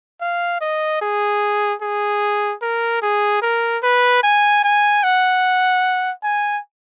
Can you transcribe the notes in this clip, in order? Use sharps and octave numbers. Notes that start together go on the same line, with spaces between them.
F5
D#5
G#4
G#4
A#4
G#4
A#4
B4
G#5
G#5
F#5
G#5